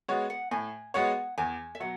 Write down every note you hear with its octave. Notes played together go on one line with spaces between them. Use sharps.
G#3 B3 F#4 C#5
F#5
A2 G#5
G#3 B3 F#4 C#5 F#5
E2 G#5
E5
B2 F#3 F#5